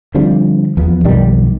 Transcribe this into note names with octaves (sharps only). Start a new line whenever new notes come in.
D3 F3 G3 C4
E2 F3 B3
B1 F2 D#3 G3